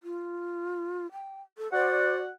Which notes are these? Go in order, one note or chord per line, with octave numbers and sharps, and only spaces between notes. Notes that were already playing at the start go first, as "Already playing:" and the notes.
F4
G5
A4
F#4 C5 D5 F#5